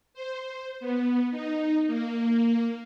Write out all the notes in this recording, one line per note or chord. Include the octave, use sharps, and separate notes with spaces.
C5
B3
D#4
A#3